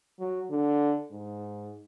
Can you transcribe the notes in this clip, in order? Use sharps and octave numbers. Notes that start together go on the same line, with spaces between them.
F#3
D3
G#2